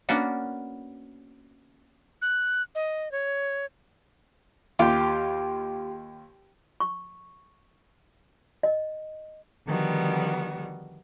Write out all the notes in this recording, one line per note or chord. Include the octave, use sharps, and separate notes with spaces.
A#3 B3 C#4 D4 F#4
F#6
D#5
C#5
D#2 F4 G4
C#6
D#5
D3 D#3 F3 G3 B3 F#4